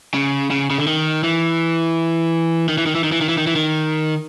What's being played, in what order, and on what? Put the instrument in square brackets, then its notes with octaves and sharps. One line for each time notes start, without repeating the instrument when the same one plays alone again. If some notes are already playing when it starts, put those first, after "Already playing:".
[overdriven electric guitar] C#3
C#3
C#3
D3
D#3
E3
D#3
E3
D#3
E3
D#3
E3
D#3
E3
D#3
E3
D#3